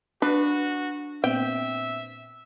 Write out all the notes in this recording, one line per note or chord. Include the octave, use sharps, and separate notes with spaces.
D4 F#4 B4
A#2 B3 C4 E5 G5